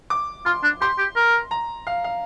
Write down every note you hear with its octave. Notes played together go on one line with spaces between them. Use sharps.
D6
F4 C6
D4
G4 C6
G4
A#4
A#5
F5
F5